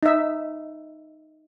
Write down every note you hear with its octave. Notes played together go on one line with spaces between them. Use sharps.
D#4 E5